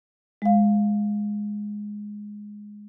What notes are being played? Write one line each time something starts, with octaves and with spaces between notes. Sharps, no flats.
G#3 F5